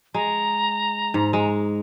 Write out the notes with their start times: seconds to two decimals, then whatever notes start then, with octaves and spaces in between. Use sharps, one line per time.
0.14 G#3 A#5
1.14 G#2
1.33 G#3